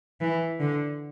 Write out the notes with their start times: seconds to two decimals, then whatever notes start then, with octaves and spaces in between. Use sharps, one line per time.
0.21 E3
0.60 D3